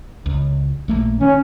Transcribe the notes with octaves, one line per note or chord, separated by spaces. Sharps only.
C#2
A#1 A3 A#3
D#3 C#4